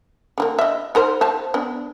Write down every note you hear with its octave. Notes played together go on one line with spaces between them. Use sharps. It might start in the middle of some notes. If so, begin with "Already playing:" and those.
D3 F#3 A#3
D#5 E5
D#4 A#4 C5
C5 F5 A5
B3 D4